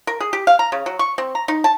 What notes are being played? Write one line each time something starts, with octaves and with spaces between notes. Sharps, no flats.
A#4
G#4
G4
F5
A#5
C#3
F#3
C#6
C4
A#5
D#4
A5